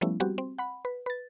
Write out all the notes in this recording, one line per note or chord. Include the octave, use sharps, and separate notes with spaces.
F3 G3 A3 B3 C#4 E4
G3 B3 C4 F#4 G4
C4
F#5 B5
B4
B4 A6